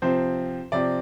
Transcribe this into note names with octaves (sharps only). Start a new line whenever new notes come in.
C3 F3 C4 C5
C3 F3 C4 D5